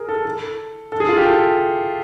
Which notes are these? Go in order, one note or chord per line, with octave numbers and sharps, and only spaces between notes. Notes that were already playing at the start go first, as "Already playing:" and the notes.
Already playing: G#4 A#4
A4
A4
A4
G#4
F4
G4
A4